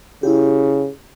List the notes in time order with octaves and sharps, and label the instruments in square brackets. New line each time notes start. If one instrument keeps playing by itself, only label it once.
[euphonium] C#3 [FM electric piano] E4 G4